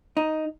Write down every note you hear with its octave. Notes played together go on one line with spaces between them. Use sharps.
D#4